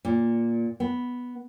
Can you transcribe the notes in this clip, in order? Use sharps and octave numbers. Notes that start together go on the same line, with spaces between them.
A#2
B3